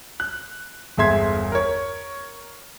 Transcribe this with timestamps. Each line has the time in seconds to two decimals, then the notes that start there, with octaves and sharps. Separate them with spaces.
0.20 F#6
0.97 G1 E2 G#3 E5 C6 G#6
1.52 A#4 C#5